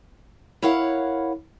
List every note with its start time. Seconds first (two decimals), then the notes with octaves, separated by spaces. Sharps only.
0.62 E4 A#4 C#5 F5 F#5